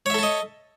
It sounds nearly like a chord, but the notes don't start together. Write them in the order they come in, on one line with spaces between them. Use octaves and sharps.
C#5 E5 A4 A5 D#5